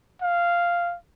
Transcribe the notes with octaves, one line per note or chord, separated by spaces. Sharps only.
F5